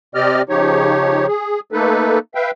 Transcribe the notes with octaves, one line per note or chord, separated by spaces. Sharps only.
C3 C4 G4 D5 D#5 F6
C#3 F3 D#4 G4 C#5
G#4
A3 A#3 D#4 A4 B4
B4 E5 F5 G5